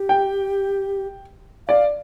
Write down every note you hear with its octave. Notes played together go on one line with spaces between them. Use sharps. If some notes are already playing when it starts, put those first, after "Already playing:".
Already playing: G4
G5
D5 F5